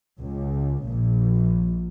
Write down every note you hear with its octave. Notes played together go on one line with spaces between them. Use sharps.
C#2
A#1